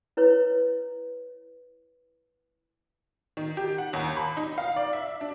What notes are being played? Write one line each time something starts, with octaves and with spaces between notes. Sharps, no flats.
E4 B4 C#5
D#3
G4
F#5
D#2
B5
D#4
F5
D5
E5
D4